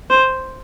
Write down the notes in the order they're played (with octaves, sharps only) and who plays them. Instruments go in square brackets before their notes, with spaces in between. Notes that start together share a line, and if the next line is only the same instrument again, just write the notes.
[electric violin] C5